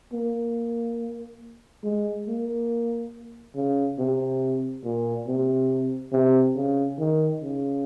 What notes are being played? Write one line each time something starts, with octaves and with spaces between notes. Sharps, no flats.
A#3
G#3
A#3
C#3
C3
A#2
C3
C3
C#3
D#3
C#3